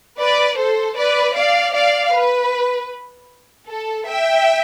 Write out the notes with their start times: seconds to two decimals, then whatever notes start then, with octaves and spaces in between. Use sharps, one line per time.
0.21 B4 D5
0.59 A4 C5
0.98 B4 D5
1.36 D5 F5
1.75 D5 F5
2.15 B4
3.69 A4
4.08 E5 G5